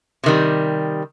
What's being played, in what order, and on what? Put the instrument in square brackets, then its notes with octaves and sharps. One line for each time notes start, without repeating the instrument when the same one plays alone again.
[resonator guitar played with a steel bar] C3 D#3 G3